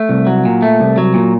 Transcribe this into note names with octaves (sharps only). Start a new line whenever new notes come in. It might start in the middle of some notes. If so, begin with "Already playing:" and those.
Already playing: A3
C2
F#3
A#2
A3
C2
F#3
A#2